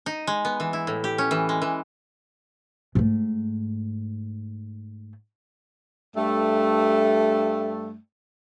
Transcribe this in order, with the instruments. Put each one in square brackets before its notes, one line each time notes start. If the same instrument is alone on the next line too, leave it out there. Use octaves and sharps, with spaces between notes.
[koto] D#4
G#3
B3
E3
E4
A2
G4
C#4
E3
G#3
E3
[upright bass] G#2 A3
[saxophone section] G2 A3